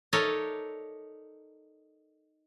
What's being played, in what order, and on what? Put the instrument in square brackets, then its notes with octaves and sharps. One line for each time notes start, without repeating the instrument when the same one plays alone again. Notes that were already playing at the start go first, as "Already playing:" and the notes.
[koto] D#4 A4 A#4 C#5 D5 E5